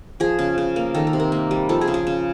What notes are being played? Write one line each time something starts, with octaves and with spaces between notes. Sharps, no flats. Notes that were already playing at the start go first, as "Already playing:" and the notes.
F3 G#4
C#3
C#3
A#3
D#3 A4
A#4
C3
A#4
A#3
G3
F3 A4
G#4
C#3
G#4
C#3